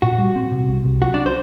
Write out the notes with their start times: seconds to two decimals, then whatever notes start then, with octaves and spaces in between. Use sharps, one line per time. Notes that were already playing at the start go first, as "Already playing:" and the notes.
0.02 A#2 F#4
0.18 G3
0.36 C4
0.52 C3
0.69 C2
0.85 C2
1.02 F#3 F#4
1.14 D4
1.26 C5